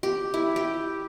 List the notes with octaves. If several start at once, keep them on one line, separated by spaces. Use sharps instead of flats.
G4
E4
G4